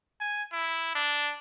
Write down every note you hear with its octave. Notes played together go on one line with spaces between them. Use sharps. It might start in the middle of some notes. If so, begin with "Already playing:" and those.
G#5
E4
D4